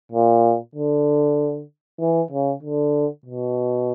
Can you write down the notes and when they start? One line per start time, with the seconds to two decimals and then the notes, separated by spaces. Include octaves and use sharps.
0.12 A#2
0.75 D3
2.00 E3
2.31 C#3
2.62 D3
3.26 B2